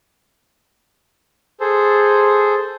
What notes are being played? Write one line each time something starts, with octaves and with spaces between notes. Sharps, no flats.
G#4 A4 C5